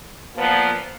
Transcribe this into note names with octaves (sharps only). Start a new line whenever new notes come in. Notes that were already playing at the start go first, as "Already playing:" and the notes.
A#2 F3 B3